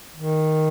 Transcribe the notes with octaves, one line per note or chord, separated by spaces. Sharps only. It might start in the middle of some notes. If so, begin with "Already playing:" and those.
D#3